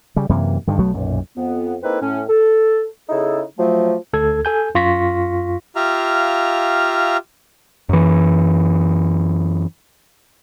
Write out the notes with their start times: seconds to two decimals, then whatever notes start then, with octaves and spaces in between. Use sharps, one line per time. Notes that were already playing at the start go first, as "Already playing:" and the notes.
0.16 C#3 G3
0.29 F#2 C3 E3 A#3
0.67 G2 D3 D#3
0.79 B1 F#3 A3 B3
0.93 B1 F#2 A#2
1.37 F2 B3
1.83 A#3 C4 D#4 E4 A4 B4
2.01 A2 C#4
2.28 A4
3.09 C#3 D#4 E4 G#4 A4
3.58 F3 F#3 A3
4.13 D2 A4 G#6
4.45 A4 G#5 G6
4.75 F#2 F4 C#6 A#6 B6
5.76 F4 G4 E5 F5 A#5
7.89 F#2 E3